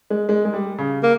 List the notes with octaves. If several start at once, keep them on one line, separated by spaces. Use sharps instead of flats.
G#3
G#3
G#3
G3
C#3
A#3